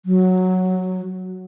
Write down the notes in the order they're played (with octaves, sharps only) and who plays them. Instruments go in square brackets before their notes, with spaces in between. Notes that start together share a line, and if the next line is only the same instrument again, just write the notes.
[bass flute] F#3